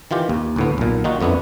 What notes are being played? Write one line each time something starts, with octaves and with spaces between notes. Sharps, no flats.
D#3 E3 F4 G4
D#2
D2 A2 B3
B1 A#2
D#3 D#4 F4 F#4
F2 A3 B3 D4 E4